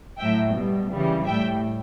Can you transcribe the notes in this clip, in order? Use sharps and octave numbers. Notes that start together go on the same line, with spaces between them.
A2 F#3 E5 G5
B2 G3
C#3 E3 G3
A2 G3 E5 G5